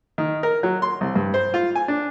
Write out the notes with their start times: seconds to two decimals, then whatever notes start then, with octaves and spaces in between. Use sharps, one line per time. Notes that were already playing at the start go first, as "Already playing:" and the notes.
0.18 D#3
0.43 A#4
0.63 F#3
0.82 C6
1.01 C2
1.15 G2
1.34 C5
1.54 F4
1.75 G#5
1.88 D4